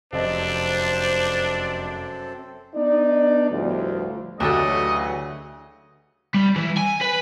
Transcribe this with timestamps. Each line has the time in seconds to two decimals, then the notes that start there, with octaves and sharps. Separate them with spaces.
0.13 F1 F#2 C4 D4 A4 C5 D#5
2.76 B3 D4 D#4 D5
3.51 G1 D2 A2 F3
4.40 D2 C#3 E3 F#3 D4 G4 A4 D#5
6.34 G3
6.56 E3
6.77 G#5
7.01 B4